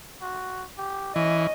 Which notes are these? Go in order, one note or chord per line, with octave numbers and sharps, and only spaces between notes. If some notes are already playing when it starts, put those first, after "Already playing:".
F#4
G4
E3 C#4 D#5